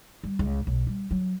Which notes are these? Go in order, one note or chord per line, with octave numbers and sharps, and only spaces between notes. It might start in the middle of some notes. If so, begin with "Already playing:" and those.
G3
C#2
B1
G3
F#3